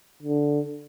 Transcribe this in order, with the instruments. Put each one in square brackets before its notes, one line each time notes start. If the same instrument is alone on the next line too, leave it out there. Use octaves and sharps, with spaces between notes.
[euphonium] D3